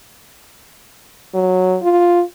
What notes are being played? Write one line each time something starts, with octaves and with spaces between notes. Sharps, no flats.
F#3
F4